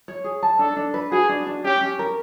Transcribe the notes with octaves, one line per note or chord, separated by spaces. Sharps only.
C#5
G#4
A5
D4 A4
D4
B4
F#4 G#4
D4
D4
C#4 G4
C#4
A#4